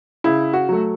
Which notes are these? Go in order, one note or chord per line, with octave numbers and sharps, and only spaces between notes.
C#3 E4
F#4
F#3 A3